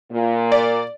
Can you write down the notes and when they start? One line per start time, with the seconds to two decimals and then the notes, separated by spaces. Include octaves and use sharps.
0.12 A#2
0.52 D5